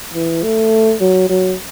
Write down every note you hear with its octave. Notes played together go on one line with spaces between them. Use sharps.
E3
A3
F#3
F#3